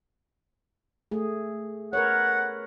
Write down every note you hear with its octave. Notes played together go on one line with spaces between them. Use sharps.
A3 G#4
A#4 B4 C#5 F#5